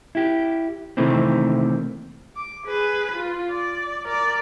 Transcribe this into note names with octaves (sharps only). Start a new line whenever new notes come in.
E4 G4
C3 D#3 E3 A3 A#3 C4
D6
G#4 B4
F4
D5
A#4 D5